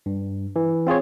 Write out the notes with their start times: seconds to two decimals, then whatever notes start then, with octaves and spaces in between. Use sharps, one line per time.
0.06 G2
0.56 E3
0.87 C4 F4 G#4 C#5